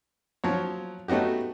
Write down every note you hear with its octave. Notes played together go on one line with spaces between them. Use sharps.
F3 F#3 C#5
A3 B3 D#4 F#4 G4